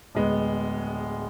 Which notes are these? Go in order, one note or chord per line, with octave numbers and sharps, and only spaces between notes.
D1 G#3 B3